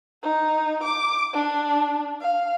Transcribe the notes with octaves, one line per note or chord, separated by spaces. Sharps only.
D#4
D6
D4
F5